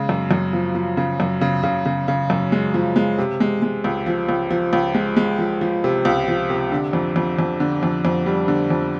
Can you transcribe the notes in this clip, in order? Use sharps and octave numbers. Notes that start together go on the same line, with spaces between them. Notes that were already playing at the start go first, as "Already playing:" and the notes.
Already playing: C#3 G#3
F#2
F#2
F3
F3
C#3
F#2
C#3
C#3
C#3
C#3
F#2
G#3
F3
G#3
C3
G#3
G#3
C#2
F3
C#2
F3
C#2
G#3
G#3
F3
F3
C3
C#2
F3
C3
D3
F2
F2
F2
D3
F2
F2
G3
D3
F2